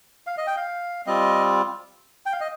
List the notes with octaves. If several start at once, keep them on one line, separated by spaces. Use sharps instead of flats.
F5
D#5
G5
F5
G3 C4 F4 D#5
G5
F5
D#5